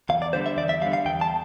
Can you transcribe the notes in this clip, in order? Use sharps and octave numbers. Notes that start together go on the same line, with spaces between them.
E2 F5
D5
D3 G3 C5
E5
E2 D5
E5
D3 G3 F5
F5
E2 G5
A5